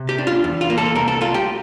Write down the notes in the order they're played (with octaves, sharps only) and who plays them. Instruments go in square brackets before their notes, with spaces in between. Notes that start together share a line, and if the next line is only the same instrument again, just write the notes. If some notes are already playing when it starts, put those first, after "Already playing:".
Already playing: [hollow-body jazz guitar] C3
G4
D4
F4
E2
F4
A#3
A4
C2 A#4
A4
A3 F4
G4